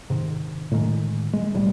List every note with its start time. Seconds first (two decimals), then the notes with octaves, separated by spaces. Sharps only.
0.10 G#2 C3 D#3
0.71 A2 D3 D#3 G#3
1.33 G#3
1.54 D1 B1 A2 G3